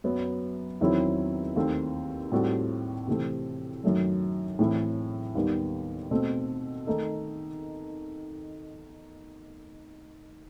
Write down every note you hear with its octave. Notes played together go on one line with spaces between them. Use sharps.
F#2 F#3 B3
E2 D#3 F#3 C4 E4
D#2 D#3 A3 C4
A2 G3 C4 F#4 A4
C3 E3 A3 C4
F#2 D#3 F#3 A3
A2 E3 A3 C4 E4
D#2 D#3 G3 B3
B2 A3 C4
D#3 A3 D#4 A4